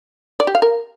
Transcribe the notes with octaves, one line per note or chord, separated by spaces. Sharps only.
D5
G4
F5
A#4